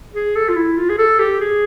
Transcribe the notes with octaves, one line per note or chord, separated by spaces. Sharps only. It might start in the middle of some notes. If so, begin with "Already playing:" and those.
G#4
A4
F4
E4
F4
G#4
A4
G4
G#4